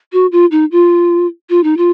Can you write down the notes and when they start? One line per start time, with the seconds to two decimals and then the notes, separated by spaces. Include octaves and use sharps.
0.13 F#4
0.32 F4
0.51 D#4
0.72 F4
1.49 F4
1.63 D#4
1.77 F4